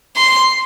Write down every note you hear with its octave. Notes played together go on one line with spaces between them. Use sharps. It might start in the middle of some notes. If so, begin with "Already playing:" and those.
C6